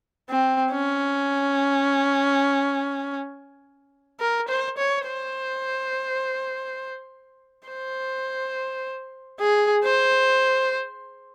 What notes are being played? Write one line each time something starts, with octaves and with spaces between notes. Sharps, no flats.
C4
C#4
A#4
C5
C#5
C5
C5
G#4
C5